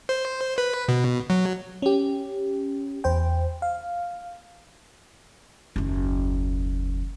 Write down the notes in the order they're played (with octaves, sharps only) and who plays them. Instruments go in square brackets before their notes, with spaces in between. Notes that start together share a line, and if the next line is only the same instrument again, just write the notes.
[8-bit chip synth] C5
B4
B2
F#3
[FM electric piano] C#4 G4
E2 C5 G5
F5
[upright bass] F#1 D#2